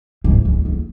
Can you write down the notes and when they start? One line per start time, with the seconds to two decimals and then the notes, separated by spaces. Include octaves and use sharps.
0.24 G#2
0.45 E2
0.65 E2